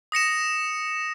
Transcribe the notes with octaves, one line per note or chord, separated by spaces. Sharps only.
D#6 A#6 C#7 E7